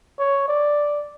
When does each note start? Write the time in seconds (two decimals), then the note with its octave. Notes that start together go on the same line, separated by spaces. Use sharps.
0.19 C#5
0.48 D5